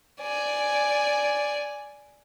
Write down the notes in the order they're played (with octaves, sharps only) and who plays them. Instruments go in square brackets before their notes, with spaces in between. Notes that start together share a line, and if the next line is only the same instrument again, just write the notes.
[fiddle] D5 G#5